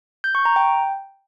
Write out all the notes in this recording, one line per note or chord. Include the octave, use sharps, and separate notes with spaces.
G6
C#6
A#5
G5